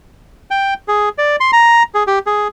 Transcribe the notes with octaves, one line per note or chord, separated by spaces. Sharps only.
G5
G#4
D5
C6
A#5
G#4
G4
G#4